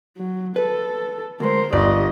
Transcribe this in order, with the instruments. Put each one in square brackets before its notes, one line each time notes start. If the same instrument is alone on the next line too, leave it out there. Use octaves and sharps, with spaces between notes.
[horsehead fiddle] F#3
[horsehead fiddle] A4 [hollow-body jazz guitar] B4
[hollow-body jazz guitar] D2 G#3 [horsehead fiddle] A#4 C5
[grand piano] G1 [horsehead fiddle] G4 D#5 [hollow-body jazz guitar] D5